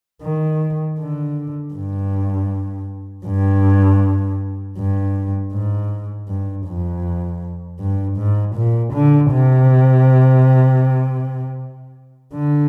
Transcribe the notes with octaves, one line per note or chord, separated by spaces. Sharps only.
D#3
D3
G2
G2
G2
G#2
G2
F2
G2
G#2
A#2
D3
C3
D3